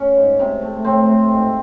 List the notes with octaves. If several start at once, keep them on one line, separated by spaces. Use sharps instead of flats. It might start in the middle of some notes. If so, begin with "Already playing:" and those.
Already playing: C#4
G#2
C3
A3
A2 C4
A3
G#2